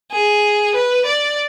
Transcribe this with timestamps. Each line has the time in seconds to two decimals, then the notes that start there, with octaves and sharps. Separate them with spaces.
0.12 G#4
0.75 B4
1.06 D5